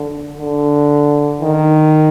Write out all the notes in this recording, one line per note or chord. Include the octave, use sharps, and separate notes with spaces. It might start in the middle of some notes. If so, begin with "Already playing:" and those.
Already playing: D3
D3
D#3